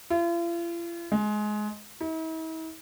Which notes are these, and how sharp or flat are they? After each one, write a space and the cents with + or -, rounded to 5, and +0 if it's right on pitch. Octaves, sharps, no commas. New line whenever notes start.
F4 -45
G#3 +20
E4 -45